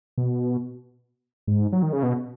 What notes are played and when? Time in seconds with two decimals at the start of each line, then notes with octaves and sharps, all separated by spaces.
0.18 B2
1.47 G#2
1.73 F#3
1.83 D#3
1.93 C#3
2.03 B2